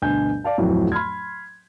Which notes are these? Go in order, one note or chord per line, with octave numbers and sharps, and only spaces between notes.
D2 G2 B2 G#5 G6
D5 F5 A5
D1 F2 A2 E3 F#3
B5 C6 F6 G#6